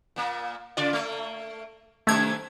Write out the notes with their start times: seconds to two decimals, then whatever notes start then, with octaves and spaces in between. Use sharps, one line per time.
0.16 A#2 A#3
0.77 C#3 F4 D5
0.93 A3 A#3
2.07 F#2 C3 D#3 A3 G#6